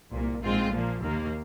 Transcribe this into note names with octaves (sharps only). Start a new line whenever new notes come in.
C2 A#2 A#3
A#1 G#2 G#3 C4 F4
A#2 F3 A#3
D#2 D#3 A#3